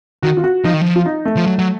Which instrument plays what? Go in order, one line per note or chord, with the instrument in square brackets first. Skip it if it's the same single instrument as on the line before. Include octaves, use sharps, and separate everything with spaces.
[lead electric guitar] D#3 [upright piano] F#4
[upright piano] F4
F#4
[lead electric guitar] F3 [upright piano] D#4
[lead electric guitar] D#3
F3
[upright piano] F4
D#4
A3
[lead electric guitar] F3
F#3
F#3